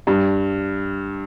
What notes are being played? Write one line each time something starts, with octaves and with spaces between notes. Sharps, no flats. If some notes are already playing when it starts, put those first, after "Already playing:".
G2